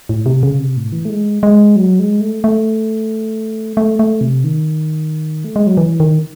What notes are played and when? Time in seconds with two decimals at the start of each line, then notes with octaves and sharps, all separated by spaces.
0.09 A2
0.26 C3
0.43 C#3
0.59 C3
0.77 A2
0.92 E3
1.05 A3
1.09 G#3
1.43 G#3
1.76 F#3
1.99 G#3
2.21 A3
2.44 A3
3.77 A3
3.99 A3
4.21 C3
4.44 D#3
5.44 A3
5.56 G#3
5.67 F#3
5.77 E3
6.00 D#3